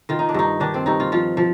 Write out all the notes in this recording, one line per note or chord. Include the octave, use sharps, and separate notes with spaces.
D#3 F4
D#4
D4
G2 D#4
D#3 D4
C4
G2 D#4
F4
F3 F4
F3